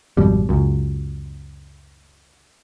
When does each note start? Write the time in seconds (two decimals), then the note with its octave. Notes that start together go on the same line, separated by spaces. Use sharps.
0.17 G#1 F2 B2 G3
0.49 C#2 F#2